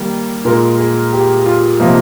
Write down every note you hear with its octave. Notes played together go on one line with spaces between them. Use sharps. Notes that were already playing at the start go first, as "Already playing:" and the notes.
Already playing: D#3 G3 A#3
A#2 G#3 A#4
G#4
G4
F4
C3 F3 A#3 D#4